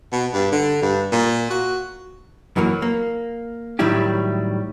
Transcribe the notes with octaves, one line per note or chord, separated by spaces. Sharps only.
B2
G2
D3
G2
A#2
F#4
F#2 E3 F#3 A#3
A#3
A2 D#3 F#3 G3 E4 G4